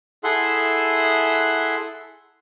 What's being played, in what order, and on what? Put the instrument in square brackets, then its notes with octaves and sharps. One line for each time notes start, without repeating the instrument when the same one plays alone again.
[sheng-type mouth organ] E4 G#4 A4 E5 F#5 C6